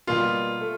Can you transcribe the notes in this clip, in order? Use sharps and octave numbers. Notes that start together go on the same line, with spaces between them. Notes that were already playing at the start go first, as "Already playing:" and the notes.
B2 G3 A#3 F4
A3